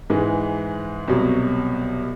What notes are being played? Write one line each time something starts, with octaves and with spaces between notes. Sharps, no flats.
G#2 E3 G#3
C2 B2 F#3